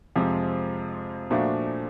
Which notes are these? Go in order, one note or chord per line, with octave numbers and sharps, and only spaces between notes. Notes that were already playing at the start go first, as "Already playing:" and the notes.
F2 C3 F3 G#3 C4
A#2 F3 A3 D4 F#4